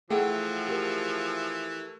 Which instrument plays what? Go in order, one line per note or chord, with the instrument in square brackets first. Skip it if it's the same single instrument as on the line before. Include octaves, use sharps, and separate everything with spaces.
[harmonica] E3 F3 [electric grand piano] A3 [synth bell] G#4 F#5 G5
[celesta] G4 A#4